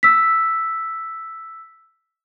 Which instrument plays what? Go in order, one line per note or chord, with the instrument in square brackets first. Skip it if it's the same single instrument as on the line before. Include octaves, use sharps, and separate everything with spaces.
[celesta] E6 B6